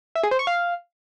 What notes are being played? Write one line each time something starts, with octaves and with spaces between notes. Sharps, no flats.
E5
G#4
C5
C#6
F5